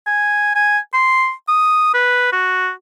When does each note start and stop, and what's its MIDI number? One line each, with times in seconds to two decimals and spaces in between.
0.07 0.54 80
0.55 0.78 80
0.94 1.32 84
1.48 1.93 87
1.94 2.29 71
2.32 2.70 66